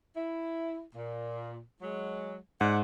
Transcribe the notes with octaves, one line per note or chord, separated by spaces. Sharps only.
E4
A#2
F#3 G#3
G#2 D5 F#5